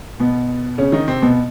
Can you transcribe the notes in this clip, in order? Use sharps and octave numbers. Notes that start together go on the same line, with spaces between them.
B2 B3
C#3 C#4
D#3 D#4
C3 C4
B2 B3